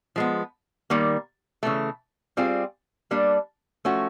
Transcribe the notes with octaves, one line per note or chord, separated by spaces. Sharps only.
F3 G#3 B3
D#3 G3 A#3
C#3 E3 A3
G3 C4 F4 G#4
G3 A#3 D4
F3 A3 C#4 F#4